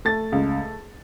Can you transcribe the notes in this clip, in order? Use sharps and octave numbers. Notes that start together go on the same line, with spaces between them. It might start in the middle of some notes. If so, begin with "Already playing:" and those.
A3 A6
C#2